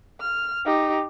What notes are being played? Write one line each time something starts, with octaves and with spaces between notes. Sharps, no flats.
F6
D#4 G4